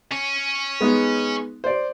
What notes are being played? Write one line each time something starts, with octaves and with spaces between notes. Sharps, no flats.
C#4
G#3 B3 D#4
C5 D5